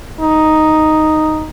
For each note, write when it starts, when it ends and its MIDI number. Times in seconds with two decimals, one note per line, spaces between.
0.21 1.49 63